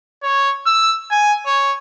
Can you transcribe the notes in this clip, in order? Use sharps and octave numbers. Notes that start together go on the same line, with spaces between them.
C#5
E6
G#5
C#5